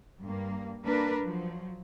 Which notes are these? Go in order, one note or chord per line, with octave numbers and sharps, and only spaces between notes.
G2 A#3
A#3 D4 A#4 B4
F3 F#3